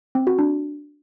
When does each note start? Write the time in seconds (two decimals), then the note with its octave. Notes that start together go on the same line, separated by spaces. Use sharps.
0.15 C4
0.27 F#4
0.39 D4